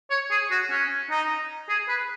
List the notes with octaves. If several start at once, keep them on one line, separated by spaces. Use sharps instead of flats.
C#5
G#4
F#4
C#4
D#4
G#4
B4